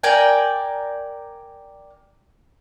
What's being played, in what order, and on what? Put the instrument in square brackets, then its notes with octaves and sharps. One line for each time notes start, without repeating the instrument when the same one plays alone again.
[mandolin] A#4 D5 G5 G#5